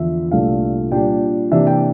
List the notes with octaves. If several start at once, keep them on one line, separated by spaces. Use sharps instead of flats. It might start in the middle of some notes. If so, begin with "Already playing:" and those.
Already playing: E2 D3 F3 E5
C2 A#2 A3 D4 F5
A#2 G3 D4 G5
C3 E3 A#3 D4 E5
G5